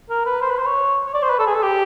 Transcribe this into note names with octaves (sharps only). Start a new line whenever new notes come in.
A#4
B4
C5
B4
C5
C#5
C#5
D5
C5
B4
A4
G#4
A4
G4